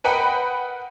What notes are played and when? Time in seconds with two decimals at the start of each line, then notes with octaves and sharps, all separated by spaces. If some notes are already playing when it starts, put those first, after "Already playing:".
0.04 A#4 B4 D#5 F#5 G5 B5